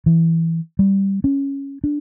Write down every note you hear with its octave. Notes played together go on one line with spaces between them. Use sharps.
E3
G3
C#4
D4